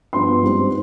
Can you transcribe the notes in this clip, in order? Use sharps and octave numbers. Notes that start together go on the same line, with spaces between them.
G2 F3 B3 C6
G#2 G3 C4